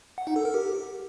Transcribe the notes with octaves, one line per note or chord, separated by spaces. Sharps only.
F#5
D#4
A4
A#4
G4